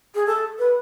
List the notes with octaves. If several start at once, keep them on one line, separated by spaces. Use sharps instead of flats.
G#4
A4
B4